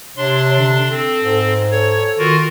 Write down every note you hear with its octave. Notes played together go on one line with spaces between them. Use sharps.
C3 D4 C#5 C6
D3
C4 A4
G#2
A4 C#5
D#3 F4 F#4 A#4